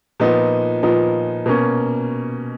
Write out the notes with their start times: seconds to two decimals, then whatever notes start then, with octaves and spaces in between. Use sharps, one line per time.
0.20 A#2 F3 B3 D#4
0.83 A#2 F3 B3 D#4
1.46 B2 A#3 C#4